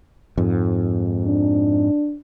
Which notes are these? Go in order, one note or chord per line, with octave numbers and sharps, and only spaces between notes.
F2 G#2
D4